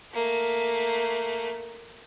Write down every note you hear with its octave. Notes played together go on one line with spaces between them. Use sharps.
A3 A#3